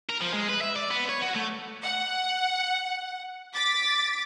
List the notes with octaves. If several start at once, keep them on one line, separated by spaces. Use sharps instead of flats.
A#4
F3
G#3
B4
E5
D5
B3
C#5
F#4
A3
F#5
D6 A6 B6